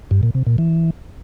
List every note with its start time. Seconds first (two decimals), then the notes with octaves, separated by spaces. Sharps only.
0.11 G2
0.23 A#2
0.35 C3
0.46 A#2
0.58 E3